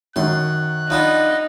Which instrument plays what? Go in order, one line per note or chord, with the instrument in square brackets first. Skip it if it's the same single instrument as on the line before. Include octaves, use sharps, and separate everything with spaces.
[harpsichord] F#2 C6 [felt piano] D#3 [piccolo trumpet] F#6
[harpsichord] F3 B3 D4 [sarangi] D#4